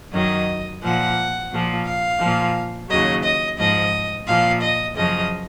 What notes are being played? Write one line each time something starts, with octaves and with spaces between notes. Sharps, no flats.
F#2 D#3 F#3 D#5
A#2 F3 F#5
A#2 F3
F5
A#2 F3
D#2 C#3 F#3 D#5
D#5
G#2 F3 D#5
A#2 F3 F5
D#5
F#2 C#3 F3 D#5